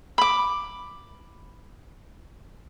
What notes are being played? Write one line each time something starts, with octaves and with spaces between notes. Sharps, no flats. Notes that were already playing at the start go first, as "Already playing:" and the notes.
B5 D6